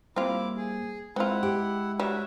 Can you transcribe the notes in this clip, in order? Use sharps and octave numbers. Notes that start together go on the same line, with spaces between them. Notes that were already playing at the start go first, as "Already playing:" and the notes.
G3 A#3 C4 E4 F4 D6
G#4
G#3 C4 E4 F4 F#5
G4
G3 F#4 C#5 E5